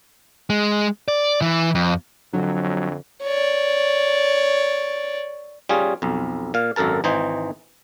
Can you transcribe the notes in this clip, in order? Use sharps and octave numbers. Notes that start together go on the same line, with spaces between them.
G#3
D5
E3 E4
F2
F2 D3 F#3
C#5 D5
G3 C#4 F4 G#4
B1 F2
A#2 F5
G#1 F#2 A4 A#4 A5
G#1 E3 D#4 C5